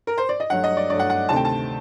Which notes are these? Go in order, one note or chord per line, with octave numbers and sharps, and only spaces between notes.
A#4
C5
D5
D#5
G2 F#3 A3 F#5
D#5
D5
G2 F#3 A3 D5
F#5
F#5
D2 C3 D#3 A3 C4 A5
G5
A5